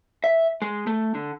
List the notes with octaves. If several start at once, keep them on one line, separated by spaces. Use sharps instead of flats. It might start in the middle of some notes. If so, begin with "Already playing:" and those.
E5
G#3
A3
D3